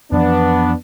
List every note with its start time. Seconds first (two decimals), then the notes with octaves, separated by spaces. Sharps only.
0.12 F2 E3 F3 B3 D4